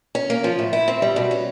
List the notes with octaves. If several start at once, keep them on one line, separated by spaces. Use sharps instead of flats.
C#4
A#3
F3
A2
E4
C4
G3
B2
C#4